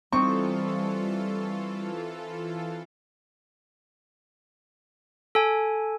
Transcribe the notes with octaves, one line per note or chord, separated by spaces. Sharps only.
E3 G3 C4 D#4 F4 A4 C#6
A4 G#5